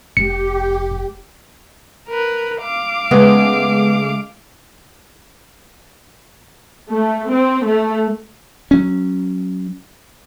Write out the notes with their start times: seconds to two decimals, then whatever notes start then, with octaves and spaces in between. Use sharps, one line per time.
0.17 F1 G4 C#7
2.09 A#4 B4
2.61 F5 D6
3.11 C#3 G#3 A3 B3
6.90 A3
7.32 C4
7.65 A3
8.71 F#3 C#4